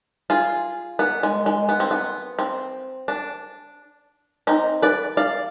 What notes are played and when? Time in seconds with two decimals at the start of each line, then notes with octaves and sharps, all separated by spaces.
0.30 F4 G#4
0.99 B3
1.23 G#3
1.46 G#3
1.69 B3
1.80 C4
1.91 B3
2.39 C4
3.08 D4
4.47 C4 D#4
4.82 B4 D5
5.17 D5 F5